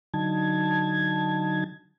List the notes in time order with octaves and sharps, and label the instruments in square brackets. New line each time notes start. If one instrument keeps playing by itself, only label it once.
[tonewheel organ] D3 F#3 D#4 A5 G#6